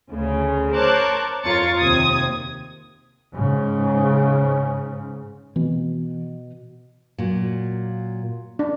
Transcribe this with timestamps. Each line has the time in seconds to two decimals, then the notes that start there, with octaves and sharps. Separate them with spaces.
0.10 D2 C#3
0.73 A#4 C5 C#5 A5 D6 F#6
1.43 F2 F4 A#4 C#5 A6 C#7
1.79 D#2 C3 D#6 G#6
3.35 G#2 C#3
5.56 B2 E3
7.18 A#2 F#3
8.59 D4